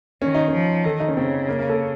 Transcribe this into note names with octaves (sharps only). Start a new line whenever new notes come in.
D#3 C#4
D#4
C#4
F3
D#3 A4
D#4
C#4
C#3 C4
A#3
A#3
A4